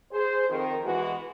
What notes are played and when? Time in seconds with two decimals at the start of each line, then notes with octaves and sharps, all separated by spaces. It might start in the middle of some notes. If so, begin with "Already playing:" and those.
0.12 G#4 C5
0.49 F2 D#3 A#4
0.85 B2 E3 G#3 B3 F#4